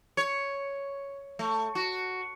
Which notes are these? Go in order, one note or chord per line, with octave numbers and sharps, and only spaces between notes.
C#5
A3
F#4